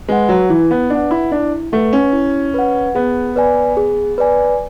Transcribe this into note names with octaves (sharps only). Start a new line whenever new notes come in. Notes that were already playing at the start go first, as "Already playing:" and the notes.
G#3 B4 F#5
F#3
E3 E4
B3
D4 B4 F#5
E4
D4 E4
A3 B4 F#5
C#4
E4
B4 F#5
B3 G#4
B4 D5 G#5
G#4
B4 D5 G#5